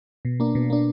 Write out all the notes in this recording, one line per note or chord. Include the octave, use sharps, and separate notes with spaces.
B2
A#3 D4
B2
A#3 D4